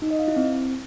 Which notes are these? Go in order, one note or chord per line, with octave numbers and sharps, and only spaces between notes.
D#4
D#5
F5
E4
C4